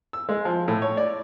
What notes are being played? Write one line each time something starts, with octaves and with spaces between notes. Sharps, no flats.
E6
G#3
F3
A2
C#5
D5